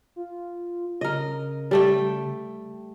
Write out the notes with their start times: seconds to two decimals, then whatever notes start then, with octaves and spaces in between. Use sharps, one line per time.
0.16 F4
1.01 C#3 A#4 D#5
1.71 G3 A3 G5